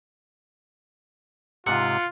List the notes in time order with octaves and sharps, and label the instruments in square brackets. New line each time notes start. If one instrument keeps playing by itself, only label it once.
[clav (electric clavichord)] G#2 C3 [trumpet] F4 [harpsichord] F#5